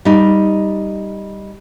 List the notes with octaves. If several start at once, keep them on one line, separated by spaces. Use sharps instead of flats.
G3 D#4